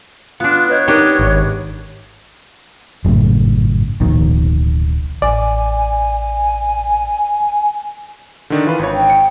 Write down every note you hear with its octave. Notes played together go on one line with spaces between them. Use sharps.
B3 D4 F4 F5
B4 C#5 D#5 G6
C4 D4 D#4 G4 A#4 D#5
G#1
G#1 F#2 A2 C#3
D1 A#1 B2 D#3
A1 D5 G#5
D3 D#3 D4
E3 F4 B4
G#1 C#5
G5
C#7